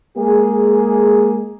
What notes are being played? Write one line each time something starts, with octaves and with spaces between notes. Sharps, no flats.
G#3 A#3 G#4